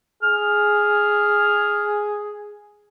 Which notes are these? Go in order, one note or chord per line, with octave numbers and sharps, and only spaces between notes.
G#4 F6